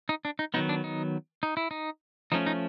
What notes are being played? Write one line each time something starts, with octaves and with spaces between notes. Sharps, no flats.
D#4
D4
D#4
D#3 F#3 B3 D#4
D4
D#4
D#4
E4
D#4
F3 A3 C#4 D#4
D#4